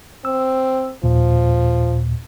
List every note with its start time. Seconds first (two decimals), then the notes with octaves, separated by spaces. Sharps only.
0.25 C4 E6
1.04 D#2 A#2 F3